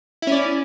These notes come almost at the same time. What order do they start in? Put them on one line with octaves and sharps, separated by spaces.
E4 C#4 D5